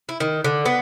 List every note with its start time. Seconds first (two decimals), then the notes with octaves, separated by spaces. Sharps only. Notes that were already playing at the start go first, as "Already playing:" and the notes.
0.09 E4
0.20 D#3
0.44 D3
0.66 B3